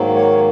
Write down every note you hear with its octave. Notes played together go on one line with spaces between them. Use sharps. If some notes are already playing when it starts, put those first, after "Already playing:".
Already playing: G#2 D#3 F#3 A#3
C#5